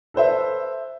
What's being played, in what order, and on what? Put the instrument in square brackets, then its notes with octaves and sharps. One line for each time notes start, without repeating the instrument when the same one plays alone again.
[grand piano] A4 B4 C5 E5